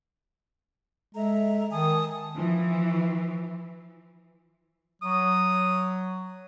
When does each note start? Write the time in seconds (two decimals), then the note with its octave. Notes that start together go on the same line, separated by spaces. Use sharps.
1.15 G#3 A4 E5 A#5
1.71 D#3 G#5 A5 D#6
2.34 E3 F3
5.02 F#3 D#6